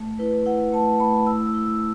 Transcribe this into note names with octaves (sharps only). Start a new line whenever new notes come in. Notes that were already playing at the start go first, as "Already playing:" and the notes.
Already playing: A3
E4 B4
E4 F#5
A3 A5
A3 B5
E4 E6
E6
E4
E6